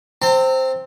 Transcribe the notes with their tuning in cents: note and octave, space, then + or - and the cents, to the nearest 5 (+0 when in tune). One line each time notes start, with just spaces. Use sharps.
C4 +0 A#5 -45